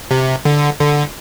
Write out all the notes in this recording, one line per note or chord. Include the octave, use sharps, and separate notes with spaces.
C3
D3
D3